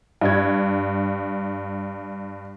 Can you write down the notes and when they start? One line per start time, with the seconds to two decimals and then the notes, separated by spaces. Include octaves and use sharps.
0.21 G2 G#6